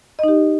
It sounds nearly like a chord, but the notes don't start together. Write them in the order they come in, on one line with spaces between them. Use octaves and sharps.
D#5 D#4 G4